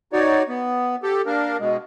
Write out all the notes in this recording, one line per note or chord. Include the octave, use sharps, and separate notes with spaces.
D#4 F#4 C#5 D5
B3
G4 A4
A#3 D4 A#4
B2 G#3